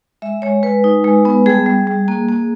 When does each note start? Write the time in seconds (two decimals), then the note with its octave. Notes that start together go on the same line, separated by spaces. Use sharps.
0.22 G#3 E5
0.42 G#3 C#5
0.63 G#3 B4
0.84 D#4
1.04 G#3
1.25 B3
1.46 G3 G#4
1.66 G3
1.87 G3
2.08 A#3
2.29 A#3